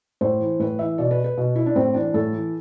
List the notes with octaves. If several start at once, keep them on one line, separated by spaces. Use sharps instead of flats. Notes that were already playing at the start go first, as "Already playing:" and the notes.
A2 C5
E3
A2 B4
E3 E5
B2 D5
B4
B4
B2
E4
D4
A2 C4
E3 D4
A2 A4
E3